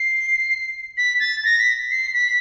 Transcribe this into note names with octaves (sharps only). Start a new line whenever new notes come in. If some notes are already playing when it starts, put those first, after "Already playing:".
Already playing: C7
B6
A6
A#6
B6
C7
B6